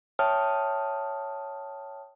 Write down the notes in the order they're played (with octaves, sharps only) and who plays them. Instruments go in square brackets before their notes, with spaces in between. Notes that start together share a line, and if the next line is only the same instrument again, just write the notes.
[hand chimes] C#5 E5 G5 A5 D#6 F6